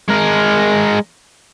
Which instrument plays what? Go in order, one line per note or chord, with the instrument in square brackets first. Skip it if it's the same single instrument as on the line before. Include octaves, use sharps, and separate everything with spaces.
[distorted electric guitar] G#3 A#4